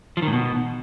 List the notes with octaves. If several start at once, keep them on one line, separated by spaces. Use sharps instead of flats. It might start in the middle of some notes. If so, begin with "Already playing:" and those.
F3
D#3
A2
B2